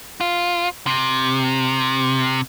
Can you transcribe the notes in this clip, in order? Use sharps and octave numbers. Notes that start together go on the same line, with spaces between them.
F4
C3